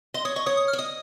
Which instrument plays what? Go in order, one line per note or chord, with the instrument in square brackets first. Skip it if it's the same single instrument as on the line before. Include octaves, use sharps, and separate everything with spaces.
[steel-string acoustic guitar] D#5 [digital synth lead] C6
[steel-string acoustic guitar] C#5 [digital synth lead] D#6
[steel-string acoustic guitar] D#5 [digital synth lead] C#6
[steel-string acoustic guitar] C#5 [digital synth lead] D#6
[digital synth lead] D#6
F6
[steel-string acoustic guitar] C#5
[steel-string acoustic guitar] D#5 [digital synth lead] D#6